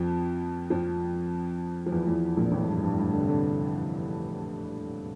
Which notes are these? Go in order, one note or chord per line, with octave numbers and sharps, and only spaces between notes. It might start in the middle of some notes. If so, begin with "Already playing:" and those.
Already playing: F2 F3
F2 F3
F3
E2 E3
E2 E3
A#1 A#2
A1 A2
F2
G2
F2
G2
A2
G2
D3
C3
D3